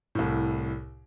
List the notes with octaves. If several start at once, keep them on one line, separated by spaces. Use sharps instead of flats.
C2 A2